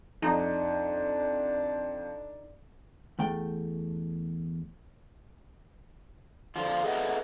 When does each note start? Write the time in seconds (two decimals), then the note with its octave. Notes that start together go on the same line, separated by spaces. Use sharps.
0.22 F2 D4 D#4
3.19 E2 A3 G5
6.56 D3 F3 F4
6.84 G#4 A4 B4 D#5 E5 F#5